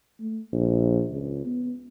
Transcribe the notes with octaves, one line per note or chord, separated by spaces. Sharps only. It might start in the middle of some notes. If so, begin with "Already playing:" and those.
A3
A#1
C#2
B3